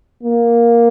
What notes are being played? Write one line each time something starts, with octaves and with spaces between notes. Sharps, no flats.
A#3